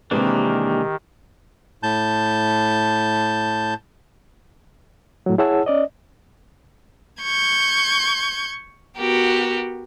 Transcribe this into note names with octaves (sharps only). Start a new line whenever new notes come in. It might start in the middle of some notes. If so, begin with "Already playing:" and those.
C3 D#3 E3 G#3 A#3 D4 G4 B4
A2 A5 G6
A2 F#3
E4 G#4 C#5 F#5 A5 E6
C#4 D5 D#5
C#6 G6 G#6
B3 F#4 G4 A#4